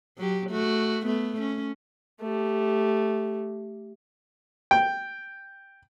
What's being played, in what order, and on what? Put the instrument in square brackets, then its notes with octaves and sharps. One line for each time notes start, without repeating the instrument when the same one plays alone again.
[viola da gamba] F#3 G4
A3 F#4
A3 B3
C#4
[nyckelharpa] A3 G4
[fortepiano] G5